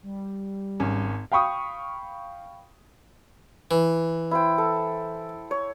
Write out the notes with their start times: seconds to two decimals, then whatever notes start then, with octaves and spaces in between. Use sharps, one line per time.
0.03 G3
0.80 G#1 C#4
1.32 F5 G5 B5 C#6 D#6
3.71 E3
4.31 E4 C5 G5
4.58 A4
5.51 C#5